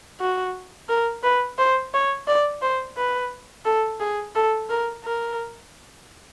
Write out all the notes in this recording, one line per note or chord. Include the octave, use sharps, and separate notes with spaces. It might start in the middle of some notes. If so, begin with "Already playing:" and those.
F#4
A#4
B4
C5
C#5
D5
C5
B4
A4
G#4
A4
A#4
A#4